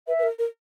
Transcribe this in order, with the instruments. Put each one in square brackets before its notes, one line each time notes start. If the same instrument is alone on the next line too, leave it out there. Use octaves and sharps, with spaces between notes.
[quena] B4 [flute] E5
[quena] B4
A#4
A#4